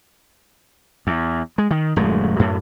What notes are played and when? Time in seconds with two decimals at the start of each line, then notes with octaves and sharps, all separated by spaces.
1.07 E2
1.58 G#3
1.71 D#3
1.96 D#1 F#2 G#3 A3
2.39 F#2 A2